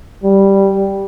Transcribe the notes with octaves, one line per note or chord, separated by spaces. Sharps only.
G3